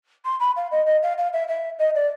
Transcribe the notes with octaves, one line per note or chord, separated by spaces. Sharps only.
C6
B5
F5
D#5
D#5
F5
F5
E5
E5
D#5
D5